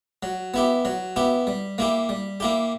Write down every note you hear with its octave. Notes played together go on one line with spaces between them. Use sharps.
F#3
B3 E4 G4
F#3
B3 E4 G4
G3
A#3 E4 G4
G3
A#3 E4 G4